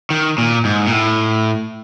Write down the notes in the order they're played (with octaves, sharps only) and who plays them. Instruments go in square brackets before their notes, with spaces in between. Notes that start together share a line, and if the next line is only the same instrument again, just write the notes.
[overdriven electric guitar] D#3
A#2
G#2
A#2
A2